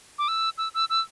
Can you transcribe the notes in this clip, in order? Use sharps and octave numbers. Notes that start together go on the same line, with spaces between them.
D6
E6
E6
E6
E6